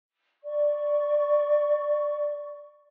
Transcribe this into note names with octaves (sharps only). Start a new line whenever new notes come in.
D5 C#6